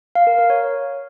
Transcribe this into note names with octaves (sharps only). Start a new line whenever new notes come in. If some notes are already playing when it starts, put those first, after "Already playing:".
F5
A#4
A#4
C#5